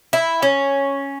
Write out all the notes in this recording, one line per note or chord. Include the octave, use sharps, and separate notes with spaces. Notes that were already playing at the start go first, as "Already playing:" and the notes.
E4
C#4